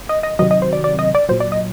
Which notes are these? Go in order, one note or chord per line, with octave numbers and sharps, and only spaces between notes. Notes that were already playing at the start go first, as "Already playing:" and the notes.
D#5
D#5
C3 D#3 F#3 D#5
D#5
C5
D5
D5
D#5
D5
A#2 F#3 C5
D5
D#5